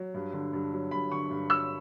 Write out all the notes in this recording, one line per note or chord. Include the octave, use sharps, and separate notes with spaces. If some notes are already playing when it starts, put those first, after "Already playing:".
Already playing: F#3
G2
D3
G2
F#3
G2 B5
D3 C#6
G2
F#3 E6